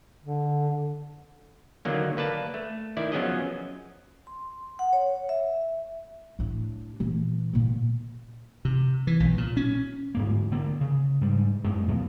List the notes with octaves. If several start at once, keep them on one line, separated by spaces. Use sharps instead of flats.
D3
D3 D#3 F#3 A#3
A#3 B4 D5 A5
A3
D#3 E4 D5
F3 F#3 B3 C#4 G#4 D#5
C6
F#5
C#5
E5
A2 D4
A#2 E3
A#2 D#3
C3
E3
B1
A#2
C#4
D1 G#2 A#3
D3 A#3
C#3
G#2 G3
F#2 G#3 A3
D#2 B2 F3 F#3